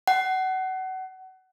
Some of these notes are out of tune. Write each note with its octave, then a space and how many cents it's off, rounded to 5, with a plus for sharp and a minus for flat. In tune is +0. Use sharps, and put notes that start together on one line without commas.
F#5 +30